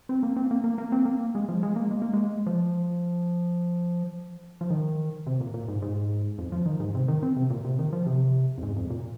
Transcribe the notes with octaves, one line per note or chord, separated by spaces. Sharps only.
C4
A#3
C4
A#3
A#3
A#3
C4
A#3
G#3
F3
G#3
A#3
G#3
A#3
G#3
F3
F3
D#3
C3
A#2
A#2
G#2
G#2
F2
F3
D#3
G#2
C3
D#3
C4
C3
A#2
C3
D#3
F3
C3
F2
G#2
F2
A#2